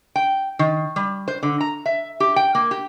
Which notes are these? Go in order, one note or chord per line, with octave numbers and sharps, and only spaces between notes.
G5
D#3
G3
C5
D3
A#5
E5
G4
G5
A#3
G4